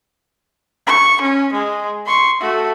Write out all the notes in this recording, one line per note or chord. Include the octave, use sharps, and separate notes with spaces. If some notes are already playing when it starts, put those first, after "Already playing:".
C#6
C#4
G#3
C6 C#6
A3 F#4